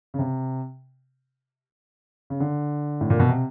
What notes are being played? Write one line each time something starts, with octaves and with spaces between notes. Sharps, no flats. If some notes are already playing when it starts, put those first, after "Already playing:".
C#3
C3
C#3
D3
A2
A#2
B2
C3